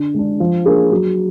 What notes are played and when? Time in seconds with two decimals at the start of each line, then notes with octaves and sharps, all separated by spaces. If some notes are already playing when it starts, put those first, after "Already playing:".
Already playing: D3
0.14 G#3 D4
0.40 F3
0.66 A#3 D4 G#4
0.91 F#3